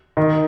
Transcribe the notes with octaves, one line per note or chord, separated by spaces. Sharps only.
D#3